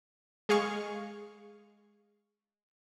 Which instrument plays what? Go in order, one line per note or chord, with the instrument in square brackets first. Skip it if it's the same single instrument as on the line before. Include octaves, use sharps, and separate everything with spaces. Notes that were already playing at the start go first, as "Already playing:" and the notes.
[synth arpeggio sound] G#3 G#4 F5 C#6